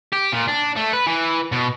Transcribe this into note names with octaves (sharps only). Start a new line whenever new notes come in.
G4
A#2
D4
A3
B4
E3
B2